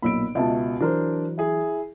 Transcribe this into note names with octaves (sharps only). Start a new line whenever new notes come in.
B1 A#2 B5 E6 D7
C#2 B2 D#5 E5 A5
E3 F#3 D4 A#4 C5
E4 G#4